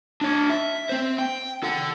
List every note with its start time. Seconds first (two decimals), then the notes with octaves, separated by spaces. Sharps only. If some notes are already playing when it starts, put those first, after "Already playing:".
0.21 D4 C#5
0.50 E5
0.89 C4 C5
1.19 G5
1.63 A4 F#5